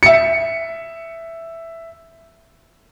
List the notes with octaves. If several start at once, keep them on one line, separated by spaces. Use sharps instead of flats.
E5 C#7